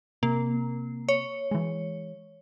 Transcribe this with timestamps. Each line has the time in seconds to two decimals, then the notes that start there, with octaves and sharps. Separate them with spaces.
0.23 C3 A#3
1.09 C#5
1.51 E3 G#3